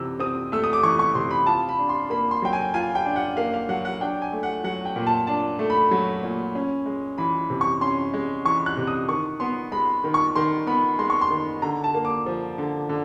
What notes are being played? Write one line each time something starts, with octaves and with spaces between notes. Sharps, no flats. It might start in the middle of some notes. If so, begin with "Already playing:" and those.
Already playing: C3 E3 E6
C4 D#6
A3 E6
D#6
D6
E3 C#6
C#6
C3 C6
B5
F4 A5
B5
D4
C6
A#3 B5
C6
F#3 G5
G#5
F4 G#5
G5
D4
F#5
A#3 F5
F5
F#3 F#5
F#5
D4 G5
G#5
A3
F#5
F#3 F#5
G5
A#2
A5
D4 A5
A3
B5
F#3
A#2
C#4
G#3
E3 B5
C3
C#6
C#4 C6
G#3
E3 C#6
F#6
C3
D#6
D#3 C#6
B3 C6
G#3 B5
D#3
C#6
D#3 C6
B3 B5
G#3 C6
C#6
C6
D#3
D3 A#5
A5
A#3
D6
F3
D3
D3